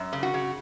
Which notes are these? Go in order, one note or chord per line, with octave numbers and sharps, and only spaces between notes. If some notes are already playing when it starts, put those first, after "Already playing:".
Already playing: F#2
C#3
F#4
C#3